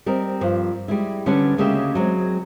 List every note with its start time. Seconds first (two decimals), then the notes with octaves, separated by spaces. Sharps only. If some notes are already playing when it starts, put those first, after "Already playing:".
0.06 G3 C4 A#4 D#5
0.41 G2 F3
0.88 G3 G#3 E4
1.26 D3 G3 B3 C#4 D4
1.58 D2 C#3 G#3 A#3 G4 E5
1.95 F#3 G#3 C4